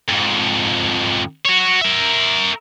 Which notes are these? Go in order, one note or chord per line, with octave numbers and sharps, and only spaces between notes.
F2 G#2
F#4 C#5
A#4 E5